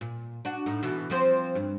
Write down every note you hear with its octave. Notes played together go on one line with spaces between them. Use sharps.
A#2
D4 F#4
A2 D#4
B2 E3
F3 C4 C5
G2